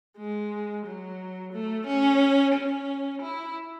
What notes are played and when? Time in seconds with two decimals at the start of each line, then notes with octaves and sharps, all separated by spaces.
0.18 G#3
0.86 F#3
1.53 A3
1.87 C#4
2.54 C#4
3.22 E4